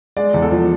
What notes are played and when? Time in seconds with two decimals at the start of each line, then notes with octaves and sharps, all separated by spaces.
0.17 G#3 D5
0.34 E2
0.42 A4
0.51 F3